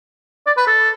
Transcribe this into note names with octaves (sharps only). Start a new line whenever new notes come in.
D5
B4
A4